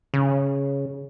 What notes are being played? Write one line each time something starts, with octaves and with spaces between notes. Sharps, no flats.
C#3